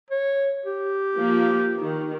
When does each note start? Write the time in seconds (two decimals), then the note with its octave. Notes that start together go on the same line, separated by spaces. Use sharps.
0.11 C#5
0.66 G4
1.16 F3 A#3
1.78 D#3